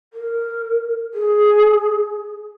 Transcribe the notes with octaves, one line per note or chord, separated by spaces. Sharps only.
A#4
G#4